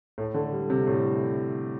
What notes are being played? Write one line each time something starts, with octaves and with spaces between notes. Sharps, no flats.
A2
D3
G3
C3
A2